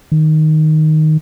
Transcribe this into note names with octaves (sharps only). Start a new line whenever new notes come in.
D#3